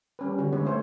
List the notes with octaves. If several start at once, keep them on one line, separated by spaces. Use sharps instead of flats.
G3 C#4 B4
D3 F#4
D3 G#3 B3 D4 B4 C#5
A3 C5 C#5